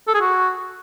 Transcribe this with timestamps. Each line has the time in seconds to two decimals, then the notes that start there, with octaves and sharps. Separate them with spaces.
0.08 A4
0.15 G#4
0.21 F#4